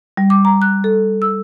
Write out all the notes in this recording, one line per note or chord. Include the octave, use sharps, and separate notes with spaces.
G3
D6
A#5
F#6
A4
E6